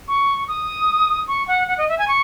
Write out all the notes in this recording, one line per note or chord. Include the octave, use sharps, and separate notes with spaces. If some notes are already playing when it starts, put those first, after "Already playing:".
C#6
D#6
C#6
F#5
F#5
D#5
E5
G#5
C#6